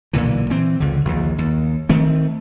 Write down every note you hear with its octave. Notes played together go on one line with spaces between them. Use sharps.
B1 A#2 D3 E3
E3 C4
C#2 D3
A#1 D#2
D#2
D#3 A3 C4